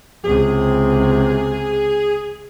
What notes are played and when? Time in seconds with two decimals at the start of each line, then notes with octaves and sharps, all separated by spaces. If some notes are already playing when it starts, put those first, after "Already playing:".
0.24 C#2 C3 G#4